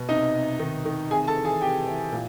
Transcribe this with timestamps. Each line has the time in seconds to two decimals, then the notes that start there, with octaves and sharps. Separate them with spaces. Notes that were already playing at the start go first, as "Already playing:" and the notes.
Already playing: B2
0.09 C3 D#4 D#5
0.34 C3
0.59 D#3
0.86 D#3
1.10 C3 G#4 G#5
1.28 A4 A5
1.36 E3
1.45 G#4 G#5
1.62 C3 G4 G5
1.88 E3
2.13 A#2